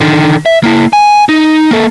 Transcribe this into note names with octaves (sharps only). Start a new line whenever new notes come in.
D3 D#3
E5
A#3 E4
G#5
D#4
A#3 A4